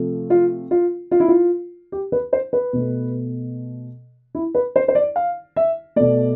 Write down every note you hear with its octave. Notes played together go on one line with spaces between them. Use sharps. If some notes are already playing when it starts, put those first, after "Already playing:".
Already playing: C3 F3 A3
F4
F4
F4
E4
F4
G4
B4
C5
B4
B2 A3
E4
B4
C5
C5
D5
F5
E5
B2 A3 D5